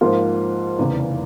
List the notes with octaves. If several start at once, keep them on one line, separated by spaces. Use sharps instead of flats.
G#2 F3 A#3 F4
F1 E2 C#3